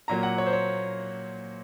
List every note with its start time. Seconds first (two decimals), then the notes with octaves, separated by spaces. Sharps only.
0.08 A#2 F#3 A#3 A#5
0.23 F#5
0.38 C#5
0.46 C5
0.53 C#5